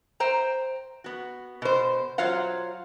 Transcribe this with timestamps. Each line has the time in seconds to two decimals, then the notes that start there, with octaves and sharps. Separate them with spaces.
0.20 C5 G5 A#5
1.04 B3 F#4
1.62 B2 C5
2.18 F#3 F4 C5 F5 F#5